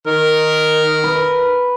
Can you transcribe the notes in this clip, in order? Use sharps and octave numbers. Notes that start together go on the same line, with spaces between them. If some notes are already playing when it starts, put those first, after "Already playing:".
D#3 A#4
B4